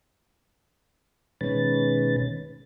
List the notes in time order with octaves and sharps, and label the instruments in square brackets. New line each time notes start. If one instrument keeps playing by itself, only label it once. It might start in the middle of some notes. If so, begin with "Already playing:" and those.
[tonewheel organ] B2 D#3 G#3 C#4 B4 A6